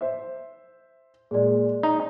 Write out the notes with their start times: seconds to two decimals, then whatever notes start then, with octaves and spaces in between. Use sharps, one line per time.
0.01 C5 E5
1.31 A#2 G#3 G#4 D5
1.83 D#4 A#5